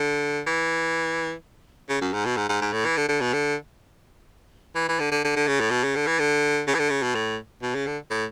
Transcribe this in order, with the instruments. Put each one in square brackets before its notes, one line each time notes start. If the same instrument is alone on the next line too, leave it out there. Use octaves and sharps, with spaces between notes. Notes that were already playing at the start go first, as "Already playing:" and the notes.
Already playing: [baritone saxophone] D3
E3
C#3
F#2
G#2
B2
G#2
G#2
G#2
A2
E3
D3
D3
B2
D3
E3
E3
D3
D3
D3
D3
C#3
A2
B2
C#3
D3
E3
D3
C#3
E3
D3
C#3
B2
A2
B2
C#3
D3
A2